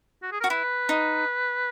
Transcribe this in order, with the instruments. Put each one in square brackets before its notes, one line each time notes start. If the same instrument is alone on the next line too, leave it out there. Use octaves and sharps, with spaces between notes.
[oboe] F#4
G#4
[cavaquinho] F#4 [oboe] A#4
[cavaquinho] E4 [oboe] B4
[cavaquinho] D#4